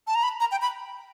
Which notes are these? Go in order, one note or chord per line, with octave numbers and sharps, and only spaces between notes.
A5
A#5
B5
A#5
G5
B5